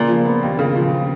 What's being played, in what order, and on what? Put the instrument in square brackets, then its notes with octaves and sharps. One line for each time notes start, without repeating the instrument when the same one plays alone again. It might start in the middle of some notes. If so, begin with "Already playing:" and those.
Already playing: [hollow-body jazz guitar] A#2 [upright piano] C#3
[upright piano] F3
B3
D#2
C#3
F3